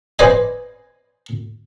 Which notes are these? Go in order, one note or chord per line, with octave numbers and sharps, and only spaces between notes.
B4 C5 D5 D#5 G#5